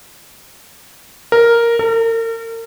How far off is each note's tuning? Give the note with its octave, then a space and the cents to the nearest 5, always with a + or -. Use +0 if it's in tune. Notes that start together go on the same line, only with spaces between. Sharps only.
A#4 +0
A#4 -40